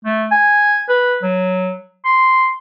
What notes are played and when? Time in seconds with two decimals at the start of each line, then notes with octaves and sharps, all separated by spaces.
0.05 A3
0.31 G#5
0.89 B4
1.23 F#3
2.05 C6